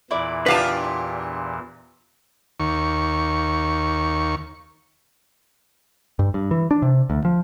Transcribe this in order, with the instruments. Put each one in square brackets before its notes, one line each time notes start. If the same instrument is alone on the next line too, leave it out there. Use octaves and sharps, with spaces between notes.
[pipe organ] E2 A#2 E3 [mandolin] E4 D5
[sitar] D4 F4 G4 [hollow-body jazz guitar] B4 F5 A5
[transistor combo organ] D#2 C#6
[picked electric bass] G2
G2
E3
D4
C3
D2
F3